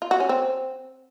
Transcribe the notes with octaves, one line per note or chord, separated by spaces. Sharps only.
F4
F#4
C#4
C4